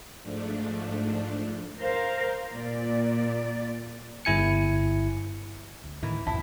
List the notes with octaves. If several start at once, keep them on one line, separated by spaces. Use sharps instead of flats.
G#2 F3 A3 D4
A#4 C5 F5
A#2 D5
G1 E4 G#5 C#7
D2
A2 D#3 E3
B1 F2 G#2 E3 E4 A5